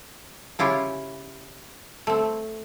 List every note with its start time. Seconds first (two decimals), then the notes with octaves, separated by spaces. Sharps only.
0.59 C#3 E4 F4 G4 C#5
2.07 A3 C4